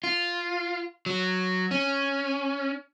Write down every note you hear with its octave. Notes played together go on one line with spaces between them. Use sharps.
F4
F#3
C#4